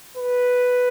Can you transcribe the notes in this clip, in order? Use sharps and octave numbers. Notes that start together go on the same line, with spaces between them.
B4